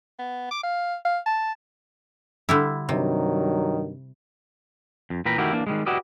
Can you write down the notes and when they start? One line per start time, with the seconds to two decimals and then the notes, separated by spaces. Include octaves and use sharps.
0.19 B3
0.51 D6
0.63 F5
1.05 F5
1.26 A5
2.49 D3 G3 E4
2.89 G2 C3 D#3 F#3
5.10 F2
5.25 A#2 E3 B4 G5 A#5 B5
5.38 D#3 A3 E4 F#4 G4 A#4
5.53 E3 A#3 D4
5.67 D#3 F3 G3 G#3
5.86 E4 F#4 G4 B4 D5 D#5